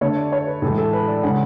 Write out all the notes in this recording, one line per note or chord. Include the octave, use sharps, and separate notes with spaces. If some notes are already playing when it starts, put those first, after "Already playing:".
D3 A3 D4 C#5
D5
C#5
B4
A2 E3 G#3 A4
A4
B4
D5
C#3 G#3 C#4 F#5